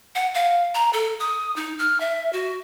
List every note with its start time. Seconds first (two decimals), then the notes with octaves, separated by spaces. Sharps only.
0.15 F#5
0.35 F5
0.74 A#5
0.93 A4
1.20 D#6
1.56 D#4
1.79 F6
2.00 E5
2.33 F#4